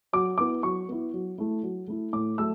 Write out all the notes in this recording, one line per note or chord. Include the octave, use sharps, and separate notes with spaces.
F#3 D6
B3 E4 D6
F#3 C#6
B3 E4
F#3
A3 E4
F#3
A3 E4
A2 D6
F#3 A3 E6